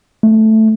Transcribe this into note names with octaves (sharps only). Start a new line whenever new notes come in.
A3